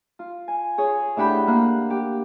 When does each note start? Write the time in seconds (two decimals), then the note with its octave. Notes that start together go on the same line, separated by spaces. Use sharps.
0.19 F4
0.48 G#5
0.78 G#4 C#5
1.17 A2 D4 G4 F#5 B5 G6
1.47 A#3 F#6
1.90 G4